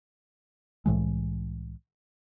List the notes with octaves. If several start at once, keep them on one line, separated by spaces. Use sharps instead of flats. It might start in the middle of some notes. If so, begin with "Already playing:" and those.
C2 A2 E3 G#3